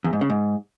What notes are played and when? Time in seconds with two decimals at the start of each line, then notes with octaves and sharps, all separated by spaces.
0.04 E2
0.13 G#2
0.21 C#3
0.30 G#2